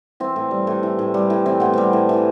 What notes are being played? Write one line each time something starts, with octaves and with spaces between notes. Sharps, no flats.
E3 C4
A2
G3
A2
E3
A2
G3
A2
E3 C4
A2 B3
G3 C4
A2
E3